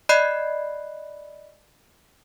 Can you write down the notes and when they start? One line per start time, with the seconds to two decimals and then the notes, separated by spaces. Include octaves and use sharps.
0.09 D5 D#5 B5 F#6 C7